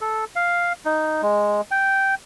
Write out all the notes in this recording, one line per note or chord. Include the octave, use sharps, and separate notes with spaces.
A4
F5
D#4
G#3
G5